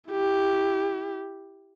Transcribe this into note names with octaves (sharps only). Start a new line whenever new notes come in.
E4 G4